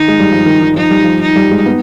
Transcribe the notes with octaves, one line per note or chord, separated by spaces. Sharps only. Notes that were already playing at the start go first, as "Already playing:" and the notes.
Already playing: D#3 D#4
G#3
G3
F3
D#3
D#3
F3 D#4
G3
F3
D#4
G3
G#3
B3